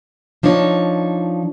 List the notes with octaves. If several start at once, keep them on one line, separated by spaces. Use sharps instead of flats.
F3 D4 D#4 C#5